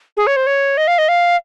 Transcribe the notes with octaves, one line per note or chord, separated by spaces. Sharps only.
G#4
C#5
C5
C#5
D#5
F5
D#5
F5